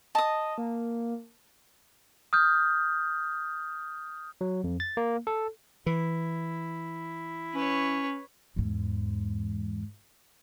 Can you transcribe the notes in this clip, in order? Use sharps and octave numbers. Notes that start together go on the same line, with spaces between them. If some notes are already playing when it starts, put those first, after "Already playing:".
D#5 A5 D#6
A#3
D#6 F6 G6
F#3
F2
A6
A#3
A4
E3 E4
C#4 B4 C#5
E2 G#2